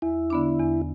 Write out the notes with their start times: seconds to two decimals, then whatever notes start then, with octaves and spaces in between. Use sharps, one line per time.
0.02 E2 E4
0.30 D3 B3 D4
0.60 E2